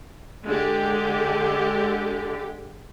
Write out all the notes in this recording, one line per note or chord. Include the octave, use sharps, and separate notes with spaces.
D3 G#3 G4